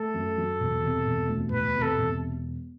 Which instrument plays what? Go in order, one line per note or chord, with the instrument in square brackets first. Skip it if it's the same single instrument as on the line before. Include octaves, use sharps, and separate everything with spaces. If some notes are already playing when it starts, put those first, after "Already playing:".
Already playing: [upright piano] A3 [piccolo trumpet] A4
[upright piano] F#2
F#3
E1
C3
E1
D2
[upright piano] E1 [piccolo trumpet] B4
[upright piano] C3
[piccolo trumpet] A4
[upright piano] E1